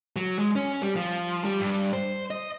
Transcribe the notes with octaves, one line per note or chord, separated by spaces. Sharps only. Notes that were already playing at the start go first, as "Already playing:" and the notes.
F#3
G#3
C#4
G3
F3
G3
G2
C5
D#5